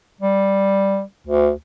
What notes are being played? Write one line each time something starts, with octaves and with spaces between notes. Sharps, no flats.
G3
D2